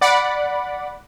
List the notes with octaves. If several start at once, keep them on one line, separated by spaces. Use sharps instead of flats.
D5 F#5 B5